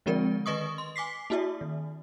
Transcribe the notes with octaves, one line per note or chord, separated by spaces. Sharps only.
D3 F3 G#3 C4 A#4 D5
D#3 B4 D#5 C#6 D#6
C6
G#5 D6 B6 C7
A#3 E4 F#4 D5 E5
D#3